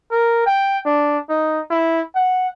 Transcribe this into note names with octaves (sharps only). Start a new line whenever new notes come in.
A#4
G5
D4
D#4
E4
F#5